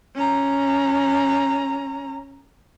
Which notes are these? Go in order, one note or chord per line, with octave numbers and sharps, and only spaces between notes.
C#4 A#5